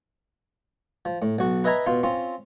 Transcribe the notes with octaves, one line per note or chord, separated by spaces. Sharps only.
F3
A2
B1 F#4
B4 D#5 E5 G#5 A#5 B5
B2 F4 F5
C4 C#4 F4